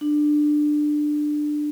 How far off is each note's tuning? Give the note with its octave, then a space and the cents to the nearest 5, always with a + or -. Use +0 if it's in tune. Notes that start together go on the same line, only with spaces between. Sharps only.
D4 +20